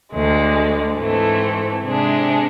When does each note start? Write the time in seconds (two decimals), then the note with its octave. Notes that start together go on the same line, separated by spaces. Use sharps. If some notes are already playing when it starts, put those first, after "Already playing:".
0.12 D2 D3 G#3
0.99 G#2 E3 A3 C4
1.84 C3 G#3 D4 G#4